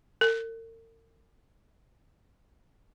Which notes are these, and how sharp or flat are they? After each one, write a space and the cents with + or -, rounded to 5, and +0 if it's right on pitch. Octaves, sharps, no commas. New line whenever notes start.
A#4 -45